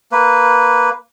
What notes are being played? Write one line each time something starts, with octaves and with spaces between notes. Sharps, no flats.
A#3 B4